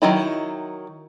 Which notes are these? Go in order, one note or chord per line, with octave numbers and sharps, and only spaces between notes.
D#3 F#3 D#4 E4